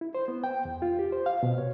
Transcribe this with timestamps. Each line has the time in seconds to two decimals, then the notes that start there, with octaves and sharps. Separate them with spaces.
0.01 E4
0.15 C5
0.28 B3
0.44 G5
0.65 E2
0.82 F4
0.99 G4
1.13 C5
1.26 F5
1.43 B2
1.58 C#5